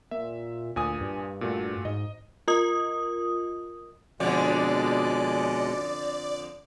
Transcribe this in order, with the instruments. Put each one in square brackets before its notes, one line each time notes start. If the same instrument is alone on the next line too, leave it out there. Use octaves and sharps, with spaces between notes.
[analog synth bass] A#2 [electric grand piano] E5
[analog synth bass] D2 [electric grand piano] A#2 G#5 D#6
[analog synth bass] G2
[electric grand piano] A#2 A3 F#4
[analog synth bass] G#2 [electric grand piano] D#5
[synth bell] F4 A#4 D#5 D#6
[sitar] F2 D3 [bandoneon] B2 G#3 [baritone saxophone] C#4 [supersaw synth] D5